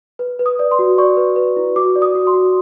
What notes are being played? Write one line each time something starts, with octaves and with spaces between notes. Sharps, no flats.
B4
B4
D#6
D5
C6
F#4
D5 C#6
B4
B4
E4
F#4 D6
D5
D#6
F#4
C6
F#4